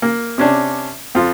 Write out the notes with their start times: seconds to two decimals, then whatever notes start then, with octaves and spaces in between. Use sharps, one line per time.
0.02 A#3
0.38 C3 C#4 D4
1.15 F2 F4